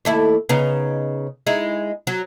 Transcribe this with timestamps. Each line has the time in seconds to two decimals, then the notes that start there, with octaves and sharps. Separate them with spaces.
0.05 D#2 A3 E4
0.49 C#3 B3 D#4
1.47 G#3 D#4 E4
2.07 F#3